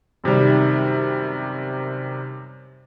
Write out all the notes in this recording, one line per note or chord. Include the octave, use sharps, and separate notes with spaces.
F#2 C3 D#3 G3